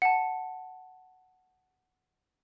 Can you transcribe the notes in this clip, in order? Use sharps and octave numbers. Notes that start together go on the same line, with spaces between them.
F#5 A5